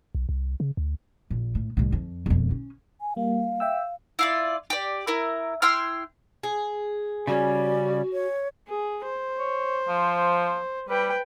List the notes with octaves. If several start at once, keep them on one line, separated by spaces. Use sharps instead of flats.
B1
C2
C#3
D2
A#1
A2
C2 A2
F2
E1 F2
C#4
G#5
G3 A#3 F5
E5 G5 E6
E4 F4 D5
G4 D5
E4 A#4
E4 G5 C6 F6
G#4
C#3 G3 C#4 F#4 D5
C#5
G#4
C5
C#5
F3
G3 B4 G5